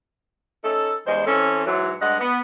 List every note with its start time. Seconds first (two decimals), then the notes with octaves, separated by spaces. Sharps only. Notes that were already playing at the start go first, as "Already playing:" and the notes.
0.63 C#4 D#4 A4
1.06 E2 G2 G#3 C5 D#5
1.26 E3 C4 C#4 A4
1.66 G#2 E3 F#3
2.01 G2 G#3 D#5 F#5
2.20 B3